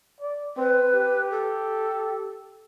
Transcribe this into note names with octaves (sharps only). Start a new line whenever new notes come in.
D5
C4 B4
G4
A4